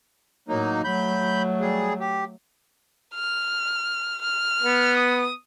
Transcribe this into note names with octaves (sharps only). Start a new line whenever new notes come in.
A2 F#3 A#3 D#4
F#3 A3 B5 G6
G3 G#4
G4
F6
F6
B3
D#6